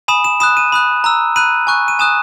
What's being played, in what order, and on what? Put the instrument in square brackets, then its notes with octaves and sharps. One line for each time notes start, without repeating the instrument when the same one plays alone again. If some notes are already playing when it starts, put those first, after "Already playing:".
[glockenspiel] G#5 B5 D#6 E7
E7
B5 D#6 F#6 E7
D#7
B5 D#6 F#6
A#5 E6
B5 F#6 D#7
G#5 C#6 F#6
D#7
G#5 D#6 F#6 E7